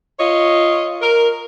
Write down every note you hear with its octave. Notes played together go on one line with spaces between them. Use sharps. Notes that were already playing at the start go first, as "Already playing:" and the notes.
F4 C#5 D#5
A#4